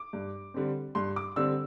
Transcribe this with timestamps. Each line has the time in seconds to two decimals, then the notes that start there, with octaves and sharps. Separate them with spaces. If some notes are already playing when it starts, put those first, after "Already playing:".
Already playing: D6
0.13 G2
0.54 D3 G3 C4
0.95 G2 C6
1.16 D6
1.36 D3 G3 C4 E6